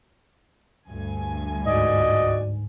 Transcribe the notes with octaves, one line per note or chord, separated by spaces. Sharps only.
D2 G2 G#5
C#2 G#2 F#4 D5 D#5